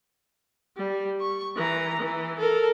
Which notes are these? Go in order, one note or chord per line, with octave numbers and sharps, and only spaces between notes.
G3
C#6
E3 A#5
E3
A4 A#4